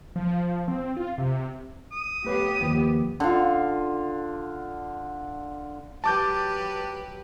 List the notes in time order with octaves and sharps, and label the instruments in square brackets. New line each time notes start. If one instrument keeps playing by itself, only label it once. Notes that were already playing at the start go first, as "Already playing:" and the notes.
[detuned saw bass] F3
C4
F4
C3
[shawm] D#6
[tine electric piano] A3 B4 C#5 [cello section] B3 G4
[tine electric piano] D#2 F3
[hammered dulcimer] D3 F4
[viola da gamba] F#3 G4 B4 [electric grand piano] A5 D6 G6